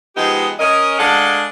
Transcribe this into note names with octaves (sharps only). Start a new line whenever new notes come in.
F3 G#3 B3 D#4 G4
C#4 A#4 D#5
G#3 D4 G#4 A4 F5 F#5